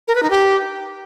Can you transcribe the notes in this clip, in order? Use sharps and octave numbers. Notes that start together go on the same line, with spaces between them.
A#4
B4
D#4
G4